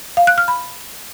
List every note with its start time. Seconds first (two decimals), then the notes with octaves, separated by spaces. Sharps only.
0.17 F5
0.27 F#6
0.38 F6
0.48 B5